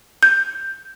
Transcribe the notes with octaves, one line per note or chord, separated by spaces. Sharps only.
G6